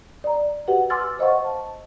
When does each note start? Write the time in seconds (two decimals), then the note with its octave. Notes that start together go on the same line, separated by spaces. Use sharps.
0.24 D5 A#5
0.68 F#4 G4 B4 F#5
0.90 G#5 C6 D6 E6 F6 A6
1.19 C5 D#5 F5 F#5 C#6
1.45 A5